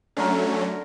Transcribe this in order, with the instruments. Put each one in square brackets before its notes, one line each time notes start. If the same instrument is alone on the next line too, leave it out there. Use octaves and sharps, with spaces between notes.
[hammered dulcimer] D3 A#4 [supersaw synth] F#3 A3 C#4